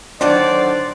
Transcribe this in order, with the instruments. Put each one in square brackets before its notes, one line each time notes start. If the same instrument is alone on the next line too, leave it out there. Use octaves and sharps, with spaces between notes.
[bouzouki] D3 D#3 F#3 [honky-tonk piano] D4 [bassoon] C5 [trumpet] D5